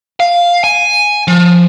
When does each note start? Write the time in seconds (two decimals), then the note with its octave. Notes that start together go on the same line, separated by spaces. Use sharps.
0.20 F5
0.64 G#5
1.28 F3